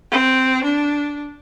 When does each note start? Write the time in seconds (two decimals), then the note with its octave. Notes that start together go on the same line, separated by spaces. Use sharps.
0.11 C4
0.63 D4